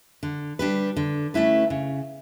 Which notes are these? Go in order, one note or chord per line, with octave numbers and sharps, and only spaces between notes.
D3
G3 D4 G4 B4
D3
A3 C#4 E4 B4
C#3